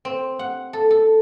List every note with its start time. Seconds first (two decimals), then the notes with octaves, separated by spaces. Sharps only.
0.05 C4
0.39 F#5
0.73 A4
0.90 A4